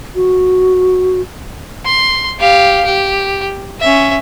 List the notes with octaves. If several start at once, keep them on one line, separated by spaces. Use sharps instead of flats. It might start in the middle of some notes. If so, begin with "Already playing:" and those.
F#4
C6
G4 F5
G4
C#4 E5